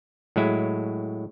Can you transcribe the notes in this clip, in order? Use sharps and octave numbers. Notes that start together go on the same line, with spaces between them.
A2 F#3 G#3 E4